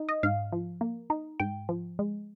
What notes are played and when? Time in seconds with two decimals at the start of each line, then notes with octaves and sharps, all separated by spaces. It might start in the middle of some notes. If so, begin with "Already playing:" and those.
Already playing: D#4
0.09 D#5
0.23 G#2 F5
0.53 F3
0.81 A#3
1.10 D#4
1.40 G#2 G5
1.69 F3
1.99 G#3